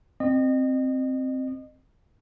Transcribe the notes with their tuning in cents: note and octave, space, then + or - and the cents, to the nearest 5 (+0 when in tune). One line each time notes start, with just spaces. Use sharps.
C4 +0 D#5 -30